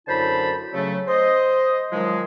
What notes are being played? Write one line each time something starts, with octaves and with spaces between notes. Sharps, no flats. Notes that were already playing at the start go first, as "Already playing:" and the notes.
F#2 D3 E4 C5 A5 B5
C#3 F#3 A3
C5 D#5
D#3 F3 F#3 G#3